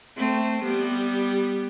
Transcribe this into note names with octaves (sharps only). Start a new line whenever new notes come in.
A3 C4
G3 B3